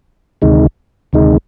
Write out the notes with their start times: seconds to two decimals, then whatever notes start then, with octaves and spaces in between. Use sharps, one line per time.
0.42 D2 C3 D#3 G#3 D#4
1.13 D2 C3 D#3 G#3 D#4